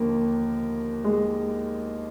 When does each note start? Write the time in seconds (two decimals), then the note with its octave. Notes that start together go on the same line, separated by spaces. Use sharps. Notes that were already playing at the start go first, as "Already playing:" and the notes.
Already playing: D#2 D3 F3 A#3
1.04 G#3